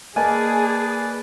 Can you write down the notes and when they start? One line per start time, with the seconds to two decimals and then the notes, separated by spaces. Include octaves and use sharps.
0.16 A#3 G#4 B4 D5 D#5 G#5 A5